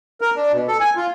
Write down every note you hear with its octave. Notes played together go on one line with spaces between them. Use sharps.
A#4
D4
B2
A4
G#5
F4